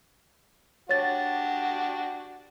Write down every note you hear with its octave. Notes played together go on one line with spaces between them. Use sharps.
D4 F#4 G4 C#5 A6